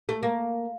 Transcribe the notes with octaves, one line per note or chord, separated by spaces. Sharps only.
A3
A#3